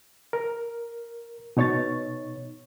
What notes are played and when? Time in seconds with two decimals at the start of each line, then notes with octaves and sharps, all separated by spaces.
0.33 A#4
1.57 B2 D#4 C#5 C#6 A6